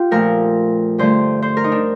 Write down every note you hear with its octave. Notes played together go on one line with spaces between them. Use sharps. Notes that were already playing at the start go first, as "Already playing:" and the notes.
Already playing: F4 G4
A#2 F3 A3 A#4
G2 D3 A3 C5
C5
A#4
D#4
D4